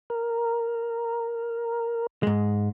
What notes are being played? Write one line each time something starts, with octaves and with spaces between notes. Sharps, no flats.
A#4
G#2 G#3